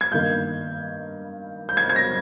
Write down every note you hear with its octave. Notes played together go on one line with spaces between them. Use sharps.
G#6
G2 D#3 A#3 G6
G6
G#6
G#6
A#6